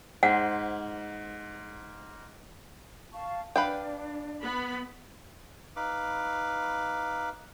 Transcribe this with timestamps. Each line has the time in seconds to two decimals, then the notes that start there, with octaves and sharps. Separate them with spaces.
0.23 G#2 C5 F#5 B6
3.13 F5 A5 C#6
3.56 D4 B4 F5 G5
4.42 B3 B5
5.76 D#4 B4 F5 B5 D6